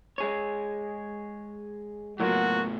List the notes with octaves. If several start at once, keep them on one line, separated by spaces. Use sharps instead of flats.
G#3 G#4 C#5
A2 F#3 A#3 B3 F4 F#4